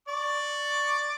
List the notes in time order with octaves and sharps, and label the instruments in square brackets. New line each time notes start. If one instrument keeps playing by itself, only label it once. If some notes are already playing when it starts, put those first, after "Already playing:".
[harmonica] D5 C#6 D6